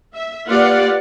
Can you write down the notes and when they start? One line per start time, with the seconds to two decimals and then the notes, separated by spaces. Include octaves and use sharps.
0.14 E5
0.47 A#3 F4 G4 B4 D5 F#5